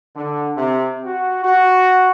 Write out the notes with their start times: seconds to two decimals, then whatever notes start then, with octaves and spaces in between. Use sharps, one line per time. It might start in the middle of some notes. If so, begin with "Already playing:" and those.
0.15 D3
0.57 C3
1.05 F#4
1.44 F#4